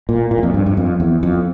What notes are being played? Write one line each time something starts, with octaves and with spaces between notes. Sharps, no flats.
A#2
A#2
E2
F2
G2
G2
F2
E2
F2